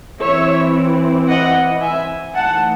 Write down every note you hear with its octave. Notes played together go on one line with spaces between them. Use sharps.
E3 C4 E4 C#5 E5
D#5 F#5
E5 G#5
E3 A3 D#4 F#5 A5